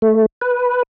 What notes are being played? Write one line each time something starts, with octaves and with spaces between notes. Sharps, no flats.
A3
B4